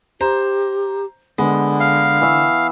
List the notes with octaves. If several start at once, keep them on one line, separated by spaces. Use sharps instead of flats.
G4 C5 A#5
D3 G#3 B3
F5
E3 E5